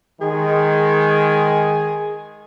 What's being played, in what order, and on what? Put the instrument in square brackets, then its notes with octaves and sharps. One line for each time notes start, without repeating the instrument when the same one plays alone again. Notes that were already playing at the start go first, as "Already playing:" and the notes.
[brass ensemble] D#3 G#3 [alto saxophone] G#4